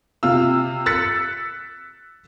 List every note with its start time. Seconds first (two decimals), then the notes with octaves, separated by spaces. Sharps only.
0.23 C3 F4 E6
0.86 E6 F#6 A6 B6 C#7